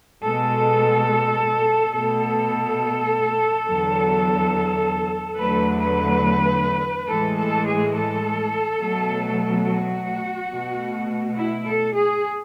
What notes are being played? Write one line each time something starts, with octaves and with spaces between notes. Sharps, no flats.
B2 G#3 A4
B2 A3 A4
E2 D3 F#3
E2 D3 F#3 A3 B4
B4
A2 E3 G#3 A4
A4
G#4
A4
B2 F#3 A3
F#4
B2 A3
E4
A4
G#4